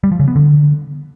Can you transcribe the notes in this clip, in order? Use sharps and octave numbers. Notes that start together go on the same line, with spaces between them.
G3
F3
C#3
B3
D3